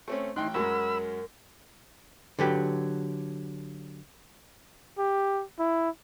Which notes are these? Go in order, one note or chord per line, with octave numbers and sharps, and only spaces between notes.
A3 C4 C#4
A1 D#4 G5 C6 F#6
F#2 F#3 G#3 A#4 B5 E6
D3 F#3 G4 B4
G4
E4